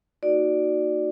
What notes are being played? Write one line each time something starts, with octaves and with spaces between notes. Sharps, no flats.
A#3 D#4 F#4 D5